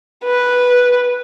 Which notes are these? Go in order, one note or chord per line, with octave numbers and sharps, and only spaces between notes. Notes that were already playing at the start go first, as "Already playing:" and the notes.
B4